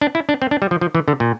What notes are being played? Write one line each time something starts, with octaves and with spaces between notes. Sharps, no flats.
D4
E4
D4
C4
D4
G3
F3
F3
E3
D3
A#2